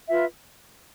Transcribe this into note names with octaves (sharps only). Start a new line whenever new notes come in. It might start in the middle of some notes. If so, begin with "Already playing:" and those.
F4 B4 E5